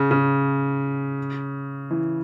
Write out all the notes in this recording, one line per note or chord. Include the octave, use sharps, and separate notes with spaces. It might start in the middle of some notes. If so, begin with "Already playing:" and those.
Already playing: C#3
C#3
E3